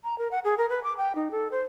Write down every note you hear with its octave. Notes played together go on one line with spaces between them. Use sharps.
A#5
A#4
F#5
G#4
A#4
B4
D6
G5
D#4
A4
C5